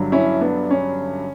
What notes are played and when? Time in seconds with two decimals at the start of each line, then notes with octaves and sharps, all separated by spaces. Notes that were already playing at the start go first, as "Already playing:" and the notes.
Already playing: G1 G2 F#3
0.12 C#4 E4
0.41 B3 D4
0.71 C#4